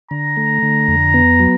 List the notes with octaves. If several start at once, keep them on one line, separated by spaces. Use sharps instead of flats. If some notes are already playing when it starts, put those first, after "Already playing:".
D3 A#5
A3
D3
F2
B3
F#3